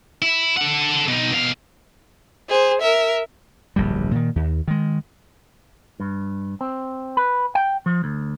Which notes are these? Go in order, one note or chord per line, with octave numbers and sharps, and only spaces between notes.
E4
A4 F#5
B2 D#4
B2 F5
G#4 C5
A#4 E5
D1 A#1 G2 G3
A#2 D#3
D#2
D#3 G#3
G2
C4
B4
G5
F3
D2